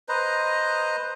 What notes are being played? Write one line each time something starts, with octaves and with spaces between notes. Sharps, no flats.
B4 C5 D#5 A#5